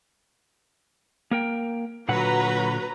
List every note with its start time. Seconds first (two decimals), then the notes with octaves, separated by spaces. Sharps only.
1.31 A#3 A#4 G5
2.09 A#2 D3 F#3 B4 F#5 A#5